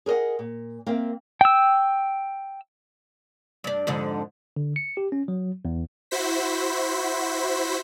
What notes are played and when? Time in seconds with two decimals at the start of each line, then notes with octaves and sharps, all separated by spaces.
0.06 G#4 A#4 B4 D#5 F#5
0.39 A#2
0.87 A#3 C4 A#4 E5 F5
1.41 G5 E6
3.64 G2 D4
3.87 F2 G#2 D3
4.56 D3
4.76 C#7
4.97 G4
5.12 C#4
5.28 F#3
5.65 E2
6.11 E4 F#4 C5 B6